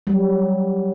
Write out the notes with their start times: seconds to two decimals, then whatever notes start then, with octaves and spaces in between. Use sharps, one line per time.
0.07 F#3 G3